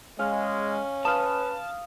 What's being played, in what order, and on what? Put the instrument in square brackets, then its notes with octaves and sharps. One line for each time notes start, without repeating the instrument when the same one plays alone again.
[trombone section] G#3 [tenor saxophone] C#4 [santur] F5
[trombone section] B4 [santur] F5 D#6 [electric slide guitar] A5